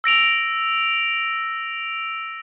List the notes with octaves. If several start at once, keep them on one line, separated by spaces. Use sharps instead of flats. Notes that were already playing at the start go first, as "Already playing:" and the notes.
E6 A#6 D7 F7